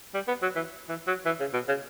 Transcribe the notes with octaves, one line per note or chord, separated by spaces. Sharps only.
G3
B3
F#3
E3
E3
F#3
E3
C#3
B2
C#3